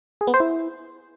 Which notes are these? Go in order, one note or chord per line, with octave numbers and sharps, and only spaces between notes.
G#4
B3
C5
E4